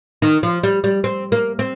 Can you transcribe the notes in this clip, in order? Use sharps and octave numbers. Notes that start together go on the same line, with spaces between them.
D#3
F3
G3
G3
C4
A#3
C4